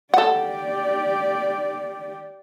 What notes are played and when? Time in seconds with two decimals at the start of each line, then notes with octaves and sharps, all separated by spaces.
0.14 G4 A4 D5 F#5